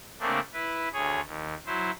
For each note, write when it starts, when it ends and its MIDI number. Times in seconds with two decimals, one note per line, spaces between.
0.20 0.40 49
0.20 0.40 57
0.20 0.40 58
0.20 0.40 60
0.20 0.40 62
0.53 0.88 64
0.53 0.88 71
0.93 1.21 38
0.93 1.21 68
0.93 1.21 73
1.24 1.54 39
1.66 1.91 54
1.66 1.91 64
1.66 1.91 72